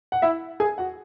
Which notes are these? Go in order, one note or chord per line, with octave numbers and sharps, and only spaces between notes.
F#5
E4 E5
G#4 G#5
F#4 F#5